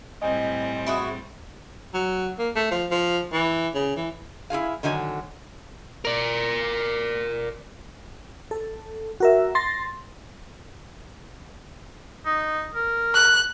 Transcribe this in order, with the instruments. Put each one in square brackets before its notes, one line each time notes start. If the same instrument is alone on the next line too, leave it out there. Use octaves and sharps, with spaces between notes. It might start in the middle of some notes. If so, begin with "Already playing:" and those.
[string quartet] A2 G3 C4 [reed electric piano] D#5 [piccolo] G#5
[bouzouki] E4 F#4 G#4
[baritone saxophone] F#3
A#3
A3
F3
F3
E3
C#3
E3
[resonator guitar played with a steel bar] E4 F#4 G#4 F5
D3 D#3 F#3 D5 G#5
[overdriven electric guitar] A#4 D5
[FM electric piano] A4
F#4 A#4 E5
C6 A6 A#6
[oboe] D#4
A#4
[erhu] F#6